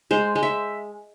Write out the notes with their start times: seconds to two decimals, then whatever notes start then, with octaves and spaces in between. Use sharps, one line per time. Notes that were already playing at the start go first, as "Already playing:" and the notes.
0.11 G#3 C5
0.35 G#3
0.43 E5